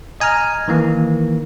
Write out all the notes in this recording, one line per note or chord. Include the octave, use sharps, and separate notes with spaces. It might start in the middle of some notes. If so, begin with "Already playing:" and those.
D#5 G#5 A#5 F6
D#3 E3 A#3